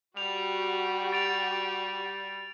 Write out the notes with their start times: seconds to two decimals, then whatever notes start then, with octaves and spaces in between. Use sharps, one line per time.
0.17 G3 F#4 G4 F7
1.12 A6 D7 F7